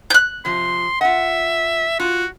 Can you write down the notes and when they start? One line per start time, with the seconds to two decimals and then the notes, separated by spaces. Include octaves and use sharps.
0.10 F#6 G6
0.45 C3 F3 C6
1.01 F4 E5 F#5
2.00 F4 F#4